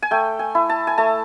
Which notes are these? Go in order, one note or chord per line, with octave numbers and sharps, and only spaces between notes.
G#5
A3 G5
G#5
E4
A5
G#5
A3 A5